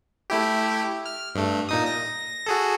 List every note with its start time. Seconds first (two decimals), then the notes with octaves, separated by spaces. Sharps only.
0.30 A3 E4 G4
1.06 F6
1.35 G2 A3
1.69 A#2 D#4 D#6
1.86 A#6
2.46 F#4 G#4 A4